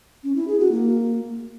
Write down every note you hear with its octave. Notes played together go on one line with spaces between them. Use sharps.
C#4
E4
G#4
F#4
A#3